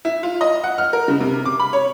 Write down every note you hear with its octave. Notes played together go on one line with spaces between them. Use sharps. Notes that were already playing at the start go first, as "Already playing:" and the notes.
E4
F4
D#5
F#5
F6
A#4
C#3
C3
D6
B5
C#5